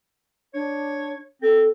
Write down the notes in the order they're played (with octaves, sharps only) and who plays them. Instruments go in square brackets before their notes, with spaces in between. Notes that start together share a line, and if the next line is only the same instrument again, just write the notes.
[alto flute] D4 [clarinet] C#5
[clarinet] C4 [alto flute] A4